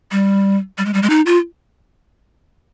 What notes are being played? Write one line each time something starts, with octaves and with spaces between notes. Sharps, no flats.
G3
G3
G#3
G3
G#3
D#4
F4